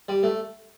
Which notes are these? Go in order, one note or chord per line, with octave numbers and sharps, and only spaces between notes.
G3
A3